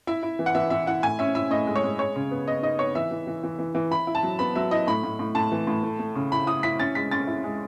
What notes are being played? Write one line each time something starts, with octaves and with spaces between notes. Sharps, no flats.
E4 E5
E4
E3
F#5
E3 E5
E3 E5
E4 F#5
A2 G#5
C#4 E5
E4 E5
A2 D#5
G#3
C#5
G#3
G#3 C#5
C#3
B3
B3 D#5
D#4 D#5
B3 C#5
E3 E5
E3
E3
E3
E3
E3
E4 B5
E4
A5
F#3
B3 B5
F#3 E5
E4 D#5
A2 B5
A2
A2
A2 A5
E3
A2
A3
A3
C#3
E4 B5
E4 D#6
E4 B6
C#4 A6
G#3 B6
C#4 A6
E4
G#3